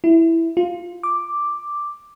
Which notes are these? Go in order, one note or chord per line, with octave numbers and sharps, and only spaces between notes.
E4
F4
D6